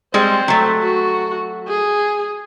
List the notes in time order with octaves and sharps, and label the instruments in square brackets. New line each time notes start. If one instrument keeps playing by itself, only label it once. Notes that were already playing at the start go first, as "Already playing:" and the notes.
[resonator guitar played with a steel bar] G3 G#3 [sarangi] C4
[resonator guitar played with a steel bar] F#3 A3
[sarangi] F#4
G#4